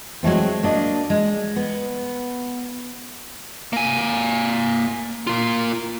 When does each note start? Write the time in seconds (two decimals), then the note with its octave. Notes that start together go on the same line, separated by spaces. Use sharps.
0.23 F#3 G#3 A3 C4
0.63 A#3 D4 D#5
1.10 G#3
1.56 B3
3.73 A#3 G#5
5.27 A#3 F4